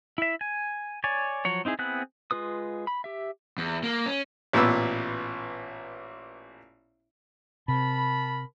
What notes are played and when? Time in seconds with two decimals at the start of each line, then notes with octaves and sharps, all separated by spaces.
0.18 E4 E5
0.41 G#5
1.04 C#5 D5 G#5
1.45 F3 F#3 C#5
1.65 C4 D#4 E4 G#4
1.79 B3 C4 E4 G#4 F#6
2.31 G#3 F4 B4 D#6
2.87 B5
3.04 G4 E5
3.58 E2
3.84 A#3
4.06 C#4
4.53 A1 A#2 B3 E6
7.68 C3 A#4 A5 B5